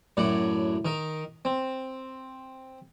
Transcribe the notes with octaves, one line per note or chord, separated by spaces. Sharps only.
F#2 A2 D5 F#5
D#3 A#4
C4